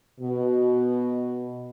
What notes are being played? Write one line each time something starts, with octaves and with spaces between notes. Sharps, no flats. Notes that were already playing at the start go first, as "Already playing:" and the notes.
B2